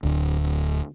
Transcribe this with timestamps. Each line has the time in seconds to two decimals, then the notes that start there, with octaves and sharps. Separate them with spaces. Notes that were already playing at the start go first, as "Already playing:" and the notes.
0.03 D1 D2